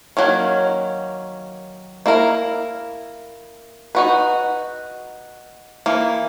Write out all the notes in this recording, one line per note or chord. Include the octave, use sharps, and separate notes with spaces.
D#3 F#3 A#3 C#4
A#3 E4 A#4
D#4 F#4 B4
E3 A#3